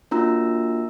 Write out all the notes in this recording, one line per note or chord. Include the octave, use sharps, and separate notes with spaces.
A#3 D4 F4 F#4 A#5 E6